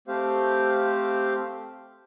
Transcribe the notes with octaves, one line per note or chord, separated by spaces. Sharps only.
A3 C4 G4 C5 F5